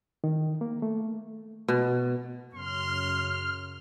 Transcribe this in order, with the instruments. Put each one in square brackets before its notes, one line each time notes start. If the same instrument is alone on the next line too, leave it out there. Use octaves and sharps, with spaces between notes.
[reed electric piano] D#3
A#3
A3
[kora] B2
[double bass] F#2 C#3 [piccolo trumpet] C6 [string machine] F6